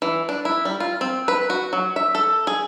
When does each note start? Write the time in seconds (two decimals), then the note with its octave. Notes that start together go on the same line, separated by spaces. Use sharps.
0.02 E3
0.29 D4
0.45 E4
0.65 G3
0.80 F4
1.01 C4
1.28 B4
1.50 F#4
1.73 F#3
1.96 E5
2.15 A4
2.47 G#4